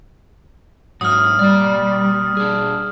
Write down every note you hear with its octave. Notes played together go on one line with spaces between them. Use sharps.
G#2 F#3 F#4 D#6 F6
G3 A#3 D5
D4 G#4